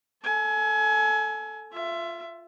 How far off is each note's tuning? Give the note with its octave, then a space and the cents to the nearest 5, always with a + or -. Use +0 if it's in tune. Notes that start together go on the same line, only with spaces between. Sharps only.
A4 +0 G#5 +25
F4 +0 E5 +25